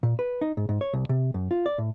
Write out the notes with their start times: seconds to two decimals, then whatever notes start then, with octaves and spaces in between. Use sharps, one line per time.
0.03 A#2
0.19 B4
0.41 D#4
0.57 G#2
0.69 G#2
0.81 C#5
0.93 C2
1.09 C3
1.34 F#2
1.51 F4
1.66 D5
1.78 A2